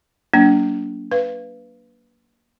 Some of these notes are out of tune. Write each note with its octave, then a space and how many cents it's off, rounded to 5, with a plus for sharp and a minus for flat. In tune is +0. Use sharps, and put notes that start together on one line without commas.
F#3 +30 A#3 +15 D4 -25
B4 +0 F5 -20